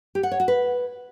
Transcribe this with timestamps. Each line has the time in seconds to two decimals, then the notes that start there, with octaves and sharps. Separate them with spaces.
0.15 G4
0.23 F#5
0.32 C#5
0.40 F#4
0.48 B4